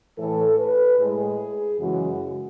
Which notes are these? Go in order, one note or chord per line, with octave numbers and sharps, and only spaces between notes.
A2 E3 A3 A4
B4
A2 G#3 G#4
F#2 C#3 E3 G#3 F#4